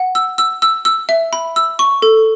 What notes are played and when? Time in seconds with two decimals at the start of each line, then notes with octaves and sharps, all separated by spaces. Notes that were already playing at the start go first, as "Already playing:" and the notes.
Already playing: F#5
0.15 E6
0.38 E6
0.62 E6
0.85 E6
1.09 E5
1.33 B5
1.56 E6
1.79 C#6
2.02 A4